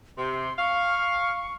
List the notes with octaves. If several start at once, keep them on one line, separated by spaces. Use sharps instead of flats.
C3 C6
F5 C#6